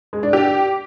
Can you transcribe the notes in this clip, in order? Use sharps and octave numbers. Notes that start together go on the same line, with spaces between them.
G#3
D4
G4